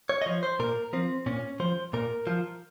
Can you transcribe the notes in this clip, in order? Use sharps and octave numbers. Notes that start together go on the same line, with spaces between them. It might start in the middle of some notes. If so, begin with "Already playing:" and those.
C#5
D#5
F3 C#5
C5
A#2 A#4
F3 C4
A#2 C#4
F3 C5
A#2 A#4
F3